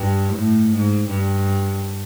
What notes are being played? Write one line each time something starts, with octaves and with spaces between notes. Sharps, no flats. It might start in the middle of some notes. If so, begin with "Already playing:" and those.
Already playing: G2
A2
G#2
G2